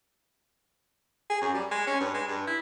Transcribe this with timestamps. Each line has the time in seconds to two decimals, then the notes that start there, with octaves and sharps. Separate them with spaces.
1.30 G#4
1.41 F#2
1.54 G3
1.71 G#3
1.87 C#4
2.00 G2
2.14 G#3
2.28 G2
2.47 E4